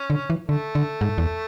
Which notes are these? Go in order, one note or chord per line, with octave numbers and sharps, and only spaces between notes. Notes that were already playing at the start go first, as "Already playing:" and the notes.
Already playing: C#4
D3
E3
D3 A3
D3
G#2
E2